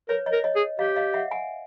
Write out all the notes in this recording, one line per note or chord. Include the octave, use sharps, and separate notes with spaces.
A#4 B4 C#5
C#5 D#5
A#4
C#5 D#5
G#4
G4 D#5 F5
D#5 F5
E5 F#5
F#5 G#5